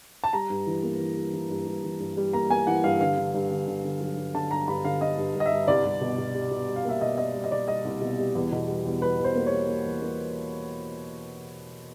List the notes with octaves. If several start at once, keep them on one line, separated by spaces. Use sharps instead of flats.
A5
G3 A#5
G2
E3
A#3
E3
G3
E3
G2
G2
E3
G2
G3
A#3 A#5
A#3 G#5
E3 F#5
G2 F5
D3 F5
D3
G2
D3
D3
D3
F#3
G2
D3 A5
G2 A#5
G2 B5
D3 F5
D3 D#5
G2
G2
D#5
E5
G2
C2 D5
C2
B2
B2
G3
B2
G3
F5
A#3 E5
B2 D#5
A#3 D#5
G3
D#5
B2 D5
G3 D#5
C2
B2
G3
E2
B2
G3
E2
G3 B4
E2
C5
A#3
C#5
G3
A#3
E2
A#3